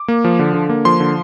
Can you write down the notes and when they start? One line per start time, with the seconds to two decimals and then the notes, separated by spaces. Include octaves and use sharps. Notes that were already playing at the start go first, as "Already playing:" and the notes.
Already playing: D6
0.08 A#3
0.24 F3
0.39 D3
0.54 D3
0.69 A#3
0.85 F3 C6
1.00 D3